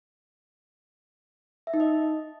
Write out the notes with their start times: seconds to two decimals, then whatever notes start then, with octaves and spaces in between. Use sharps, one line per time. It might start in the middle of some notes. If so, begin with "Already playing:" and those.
1.67 E5
1.74 D#4
1.80 D#5